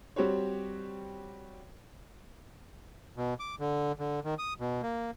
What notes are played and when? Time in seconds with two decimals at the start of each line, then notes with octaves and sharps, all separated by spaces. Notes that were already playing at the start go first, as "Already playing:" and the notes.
0.16 G3 C4 F#4 G4 C5 C#5
3.17 B2
3.40 D6
3.60 D3
3.99 D3
4.25 D#3
4.39 D#6
4.60 B2
4.83 A#3